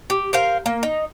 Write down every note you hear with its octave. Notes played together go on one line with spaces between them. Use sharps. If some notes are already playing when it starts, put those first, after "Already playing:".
G4
A#4 C5 F5
A#3
D#4